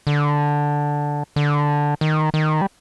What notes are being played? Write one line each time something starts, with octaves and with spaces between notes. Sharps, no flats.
D3
D3
D#3
D#3
G3